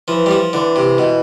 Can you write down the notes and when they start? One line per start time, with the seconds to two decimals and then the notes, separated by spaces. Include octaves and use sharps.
0.08 E3 F3
0.26 G3
0.31 F3
0.53 D3 E3
0.76 C3
0.98 B2